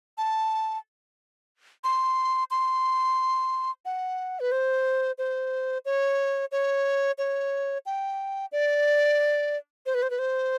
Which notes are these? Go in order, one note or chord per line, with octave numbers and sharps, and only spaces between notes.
A5
C6
C6
F#5
B4
C5
C5
C#5
C#5
C#5
G5
D5
C5
B4
C5
B4
C5